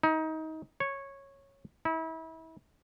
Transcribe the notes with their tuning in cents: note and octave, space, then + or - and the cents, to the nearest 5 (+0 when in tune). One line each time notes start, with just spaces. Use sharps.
D#4 +25
C#5 -10
E4 -35